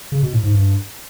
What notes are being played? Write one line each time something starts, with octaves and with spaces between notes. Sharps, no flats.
C#3
B2
A2
G#2
G2